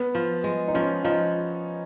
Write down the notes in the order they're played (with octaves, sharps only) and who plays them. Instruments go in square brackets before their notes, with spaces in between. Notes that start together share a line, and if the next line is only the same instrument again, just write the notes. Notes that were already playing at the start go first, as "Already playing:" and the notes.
Already playing: [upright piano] B3
[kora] F3
G#3
[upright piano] D#4
[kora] F3 [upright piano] C#4
[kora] F3 [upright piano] D#4